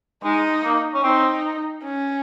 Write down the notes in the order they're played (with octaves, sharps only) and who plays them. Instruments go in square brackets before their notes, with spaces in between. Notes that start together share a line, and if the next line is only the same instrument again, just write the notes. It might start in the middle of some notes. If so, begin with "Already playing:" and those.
[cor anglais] G#3 [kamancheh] D#4
[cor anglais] A#3
C#4
[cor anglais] C4 [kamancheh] D#4
[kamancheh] C#4